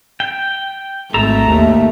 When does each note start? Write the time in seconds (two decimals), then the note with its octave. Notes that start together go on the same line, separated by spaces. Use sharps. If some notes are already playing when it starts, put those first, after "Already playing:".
0.20 G5
1.14 G#1 A3 A4 A#5
1.47 D#2